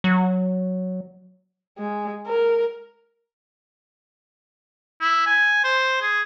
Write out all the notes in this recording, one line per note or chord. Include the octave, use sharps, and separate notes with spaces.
F#3
G#3
A#4
E4
G#5
C5
G#4